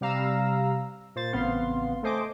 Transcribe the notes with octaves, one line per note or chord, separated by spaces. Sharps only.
C3 G3 F5 A#5 E6
A#2 C5 A6
A1 C#3 B3 C4 F5 C6
A3 A4 C5 D#5 G#5 D6